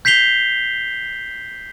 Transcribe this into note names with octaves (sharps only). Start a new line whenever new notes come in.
G6 B6 C7 F7 G7